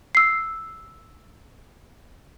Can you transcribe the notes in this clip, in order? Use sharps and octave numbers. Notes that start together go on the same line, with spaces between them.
E6 C7